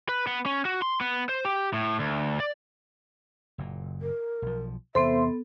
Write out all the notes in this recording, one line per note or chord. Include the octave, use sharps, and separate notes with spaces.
B4
B3
C#4
F#4
C6
B3
C5
G4
A2
D2
D5
F#1 A#2
A#4
B1 F3
E2 C3 B3 A4 C5 E5 C6